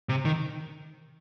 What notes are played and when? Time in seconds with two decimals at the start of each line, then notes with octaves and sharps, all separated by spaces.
0.09 C3
0.25 D#3